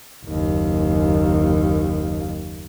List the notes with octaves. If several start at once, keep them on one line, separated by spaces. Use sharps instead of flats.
F#1 D#2